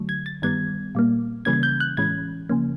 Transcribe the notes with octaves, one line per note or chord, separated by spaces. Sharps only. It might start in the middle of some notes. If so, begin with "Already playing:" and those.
Already playing: D3 F#3 A3
G#6
A6
G2 D#3 G3 B3 G#6
A#2 G3 A#3
C#3 E3 G3 A#3 C#4 G#6
G6
F#6
A2 E3 G#3 C#4 G#6
C#3 F3 A#3 C#4